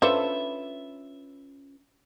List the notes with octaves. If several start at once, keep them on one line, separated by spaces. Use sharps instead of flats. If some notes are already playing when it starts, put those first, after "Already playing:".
C#4 D4 F4 A4 B4 C5 E5